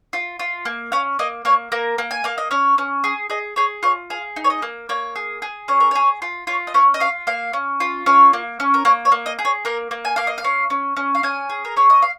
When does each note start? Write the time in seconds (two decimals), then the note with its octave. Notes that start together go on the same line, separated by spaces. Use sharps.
0.13 F4
0.39 F4
0.65 A#3
0.92 C#4 F5
1.19 A#3 D#5
1.45 A#3 C#5
1.72 A#3 A#4
1.98 A#3
2.11 G#5
2.24 A#3 F5
2.38 D#5
2.51 C#4 C#5
2.78 C#4
3.04 G#4
3.30 G#4 D#5
3.56 G#4 C#5
3.83 F4 C#5
4.10 G#4 F5
4.36 D#4
4.44 C#5
4.50 D#5
4.62 A#3
4.89 A#3 C#5
5.16 G#4
5.42 G#4
5.68 C#4 C#5
5.80 A#4
5.91 G#4 C#5
6.22 F4
6.47 F4 C#5
6.67 D#5
6.74 C#4 C#5
6.94 D#5
7.00 F4 F5
7.27 A#3 F5
7.53 C#4
7.80 F4
8.06 C#4 C#5
8.33 A#3
8.60 C#4
8.74 A#4
8.85 A#3 C#5
9.05 C#5
9.12 A#3
9.26 D#5
9.39 G#4
9.45 C#5
9.65 A#3 A#4
9.91 A#3
10.05 G#5
10.16 A#3 F5
10.27 D#5
10.38 F5
10.44 C#4
10.70 C#4
10.96 C#4
11.15 F5
11.23 C#4 G#5
11.50 G#4
11.65 A#4
11.77 C#4 C#5
11.90 D#5
12.02 F5